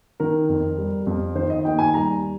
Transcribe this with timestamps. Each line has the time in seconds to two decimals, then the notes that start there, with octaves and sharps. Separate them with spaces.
0.20 D#3 A#4
0.49 F2
0.78 G3
1.07 F2
1.35 D#3 C5
1.50 D#5
1.65 D#2 G5
1.79 G#5
1.94 G3 A#5